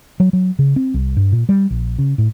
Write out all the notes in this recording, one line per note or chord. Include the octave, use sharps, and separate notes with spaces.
F#3
F#3
C#3
C4
C2
G2
A#2
G3
A#1
C#3
A2